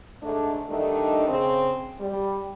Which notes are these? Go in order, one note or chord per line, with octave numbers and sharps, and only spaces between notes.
G#2 D3 A3 D4
D3 D#3 G3 A3 D4 D#4
C#3 C4
G3